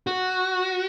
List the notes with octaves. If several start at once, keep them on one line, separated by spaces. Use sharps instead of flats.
F#4